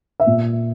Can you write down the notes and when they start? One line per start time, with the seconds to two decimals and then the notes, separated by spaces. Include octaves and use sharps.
0.20 E5
0.26 A#2